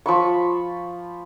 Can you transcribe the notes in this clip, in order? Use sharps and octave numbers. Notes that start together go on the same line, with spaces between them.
F3 B5 C#6